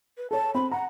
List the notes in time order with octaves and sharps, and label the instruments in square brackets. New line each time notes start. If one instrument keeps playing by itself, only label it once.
[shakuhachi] B4
[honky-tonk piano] A4 C#5 [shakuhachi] A5
[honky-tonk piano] C4 [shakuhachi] B5
[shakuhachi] F#5 [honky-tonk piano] A#5